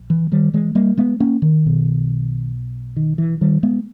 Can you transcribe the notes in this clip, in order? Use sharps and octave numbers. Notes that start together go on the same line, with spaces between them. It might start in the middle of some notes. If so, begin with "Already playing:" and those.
Already playing: A#1 A#2
E3
D#3 G3
E3 G#3
G3 A#3
G#3 B3
A#3 C#4
D#3
B1 B2
D#3
E3
D#3 G3
G#3 B3